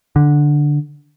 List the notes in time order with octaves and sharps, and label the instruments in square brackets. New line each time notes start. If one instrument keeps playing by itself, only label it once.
[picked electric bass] D3